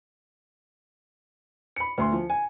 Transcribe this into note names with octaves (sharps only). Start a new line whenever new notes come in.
B5 C#7
D2 C6
F3
G#5